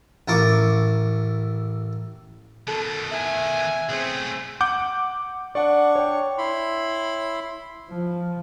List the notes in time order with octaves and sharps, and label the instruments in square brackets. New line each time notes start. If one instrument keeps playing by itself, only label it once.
[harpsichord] A1 E4 A#4 A5 C#6 D6
[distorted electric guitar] B2 D#3 [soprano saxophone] A4
[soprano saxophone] E5 [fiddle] G#5
[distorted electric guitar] B1 A3 [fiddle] C4 G#4
[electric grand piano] F#5 D6 G6
[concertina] D4 C#6 [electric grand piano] D5 F#5
[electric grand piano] C#5 G5
[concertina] E4 B5 C6
[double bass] F3